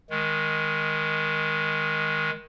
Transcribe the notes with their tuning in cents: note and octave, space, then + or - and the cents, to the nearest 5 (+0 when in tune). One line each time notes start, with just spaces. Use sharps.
D#3 +10 G#3 +0